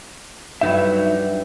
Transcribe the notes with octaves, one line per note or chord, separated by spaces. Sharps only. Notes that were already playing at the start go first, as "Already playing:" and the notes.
G2 F#3 B3 D#4 E4 E5